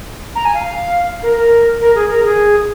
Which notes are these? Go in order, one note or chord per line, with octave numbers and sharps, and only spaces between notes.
A#5
G#5
F5
A#4
A#4
A#4
G#4
A#4
G#4